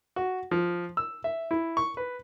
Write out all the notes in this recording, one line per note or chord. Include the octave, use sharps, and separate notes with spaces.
F#4
F3
E6
E5
E4
C#6
B4